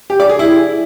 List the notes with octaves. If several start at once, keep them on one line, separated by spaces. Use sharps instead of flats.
G4
D5
G#4
E4